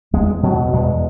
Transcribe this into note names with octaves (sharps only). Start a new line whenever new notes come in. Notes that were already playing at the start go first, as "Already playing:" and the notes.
E2 G#3
B2 F#3
E2 G#3